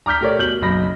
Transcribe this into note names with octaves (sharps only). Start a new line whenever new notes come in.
A#5 D6 F6 G6 B6
A3 G4 A#4 C#5 D5
B2 G6 F#7
F#1 B1 D#5 B5 A#6